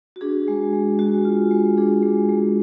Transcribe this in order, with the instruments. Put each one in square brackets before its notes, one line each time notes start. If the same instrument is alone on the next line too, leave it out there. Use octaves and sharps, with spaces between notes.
[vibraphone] F#4
D4 G#4
G#3
G#3
G#3 F#4
F4
G#3
D4 G#4
G#3
G#3